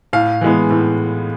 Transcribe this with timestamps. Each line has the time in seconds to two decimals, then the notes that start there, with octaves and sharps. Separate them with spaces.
0.13 A2 F5
0.41 E3 G#3 B3
0.70 A2